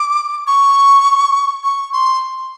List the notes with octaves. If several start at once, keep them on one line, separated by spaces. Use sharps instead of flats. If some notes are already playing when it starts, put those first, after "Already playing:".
Already playing: D6
C#6
C#6
C6